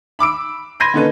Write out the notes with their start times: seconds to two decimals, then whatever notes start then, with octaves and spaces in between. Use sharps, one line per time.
0.19 B5 D6 E6 D7
0.80 B5 C6 G6 G#6 A#6 D#7
0.94 D3 A#3 C#4 D#4 A4 B4